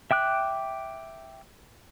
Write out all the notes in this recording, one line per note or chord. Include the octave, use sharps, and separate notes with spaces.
E5 G5 D6 F#6